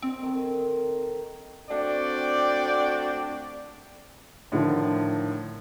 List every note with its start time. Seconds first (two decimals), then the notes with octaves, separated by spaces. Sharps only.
0.02 C4 C5 D#5
0.23 D#3 A4
1.70 A3 C4 D4 F#4 D5 G5
4.52 A2 D3 D#3 F3